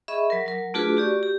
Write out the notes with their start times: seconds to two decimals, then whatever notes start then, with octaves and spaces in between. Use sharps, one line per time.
0.08 G#4 D#5 E5 B5 C#6
0.30 F#3 A#4
0.46 F#3 A#4
0.74 A3 D4 F4 F#4 G#4 B4
0.97 F#4 G4 D5 C#6
1.23 G4